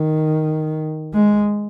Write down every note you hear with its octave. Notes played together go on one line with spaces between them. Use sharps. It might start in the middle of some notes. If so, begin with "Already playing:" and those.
Already playing: D#3
G#3